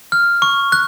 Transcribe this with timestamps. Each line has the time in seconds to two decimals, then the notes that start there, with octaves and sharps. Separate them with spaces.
0.12 F6
0.42 C#6
0.72 F#6